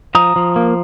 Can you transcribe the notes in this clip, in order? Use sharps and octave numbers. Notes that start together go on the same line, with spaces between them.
F3 A#5 D#6
F3
A#3